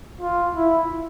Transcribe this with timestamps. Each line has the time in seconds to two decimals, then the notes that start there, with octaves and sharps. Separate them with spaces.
0.21 F4
0.55 E4